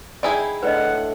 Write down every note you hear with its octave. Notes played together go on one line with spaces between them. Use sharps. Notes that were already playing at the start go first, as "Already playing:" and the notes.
D#4 E4 G#4 D5 G5 G#5
A2 D3 B4 D5 D#5 F#5